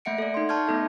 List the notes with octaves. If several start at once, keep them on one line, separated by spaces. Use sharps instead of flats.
A3 A#3 E5 F#5 C#7 D7
A4 D5
D#4 C6
A5 C6 C#6 F6 G6 G#6
A3 B3 D#4 A4 E5